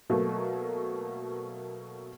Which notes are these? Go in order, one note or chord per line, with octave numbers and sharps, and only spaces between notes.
B2 F#3 A3 A#3